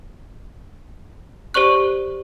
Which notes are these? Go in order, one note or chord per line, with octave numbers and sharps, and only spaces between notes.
G4 C5 D5 C#6 F#6